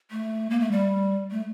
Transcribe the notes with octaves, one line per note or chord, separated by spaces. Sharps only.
A3
A#3
A3
G3
A3